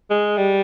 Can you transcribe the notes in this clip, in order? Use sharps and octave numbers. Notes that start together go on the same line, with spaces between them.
G#3
G3